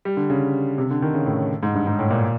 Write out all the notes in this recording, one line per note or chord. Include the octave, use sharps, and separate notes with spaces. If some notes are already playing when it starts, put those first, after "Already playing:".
G3
D3
C#3
C3
D3
D#3
C#3
A2
G#2
G2
G#2
A2
A#2